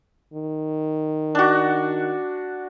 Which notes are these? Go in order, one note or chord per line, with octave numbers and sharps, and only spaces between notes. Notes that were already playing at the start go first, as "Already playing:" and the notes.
D#3
D4 F#4